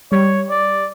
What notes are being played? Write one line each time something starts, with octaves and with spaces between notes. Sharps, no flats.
G3 C#5
D5